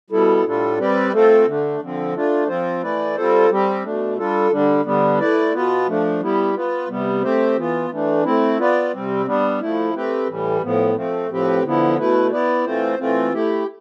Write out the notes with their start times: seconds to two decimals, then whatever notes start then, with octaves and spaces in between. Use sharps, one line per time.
0.10 B2 G3 B3 E4 A4
0.44 A2 G3 D4 F4 A4
0.78 G3 C4 G4 B4 D5
1.12 A3 C4 F4 A4 C5
1.46 D3 A3 D4
1.80 D3 F3 C4
2.14 A3 D4 F4
2.48 F3 C4 F4 C5
2.82 E3 A3 E4 B4 D5
3.16 G3 C4 F4 A4 C5
3.50 G3 C4 G4
3.83 B2 A3 D4
4.17 G3 D4 F4 A4
4.51 D3 G3 D4
4.85 D3 G3 B3 D4
5.19 A3 E4 B4 D5
5.53 B2 B3 F4 B4
5.87 F3 A3 D4
6.21 G3 B3 E4 G4
6.55 B3 F4 B4
6.88 C3 G3 B3
7.22 A3 C4 G4 C5
7.56 E3 B3 F4
7.90 E3 A3 D4
8.24 A3 C4 E4
8.58 B3 F4 B4 D5
8.92 C3 G3 C4
9.26 G3 B3 D4
9.60 F3 A3 E4
9.94 A3 C4 G4 B4
10.28 A2 E3 G3
10.62 A2 F3 B3
10.95 F3 A3 C4
11.29 A2 F3 C4 G4 B4
11.63 D3 F3 B3 E4
11.97 B2 A3 E4 B4
12.31 B3 E4 B4 D5
12.65 E3 A3 C4 F4 C5
12.99 E3 A3 C4 F4
13.33 A3 E4 G4